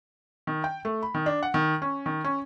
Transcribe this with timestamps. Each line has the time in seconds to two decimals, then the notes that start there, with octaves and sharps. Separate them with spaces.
0.47 D#3
0.64 G5
0.85 A3
1.03 B5
1.14 D#3
1.26 D4
1.43 F#5
1.54 D#3
1.82 C#4
2.06 D#3
2.24 C#4